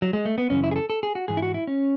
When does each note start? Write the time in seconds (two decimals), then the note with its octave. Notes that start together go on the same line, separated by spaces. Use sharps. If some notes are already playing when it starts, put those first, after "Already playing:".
0.02 F#3
0.13 G#3
0.25 A3
0.38 B3
0.50 F#2 C#3 E3 C#4
0.64 E4
0.71 G#4
0.76 A4
0.90 A4
1.03 G#4
1.15 F#4
1.28 G#2 E3 G#4
1.37 E4
1.42 F#4
1.54 E4
1.67 C#4